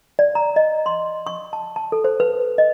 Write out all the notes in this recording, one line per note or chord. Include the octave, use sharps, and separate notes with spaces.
D5
A#5
D#5
C6
C#6
A5
A5
A4
C5
B4
D#5